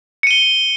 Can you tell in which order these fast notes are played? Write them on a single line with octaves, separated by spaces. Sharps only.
C#7 D#7 G7